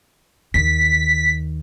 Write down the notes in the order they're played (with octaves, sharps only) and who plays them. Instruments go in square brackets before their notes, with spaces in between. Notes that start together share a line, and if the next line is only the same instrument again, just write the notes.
[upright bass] D#2 D#3 [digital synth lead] B6